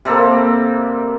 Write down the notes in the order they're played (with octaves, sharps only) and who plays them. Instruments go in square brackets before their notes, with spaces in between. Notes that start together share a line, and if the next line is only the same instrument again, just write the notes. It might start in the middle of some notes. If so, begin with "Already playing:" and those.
[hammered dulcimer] C3 A#3 [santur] G3 C4 A4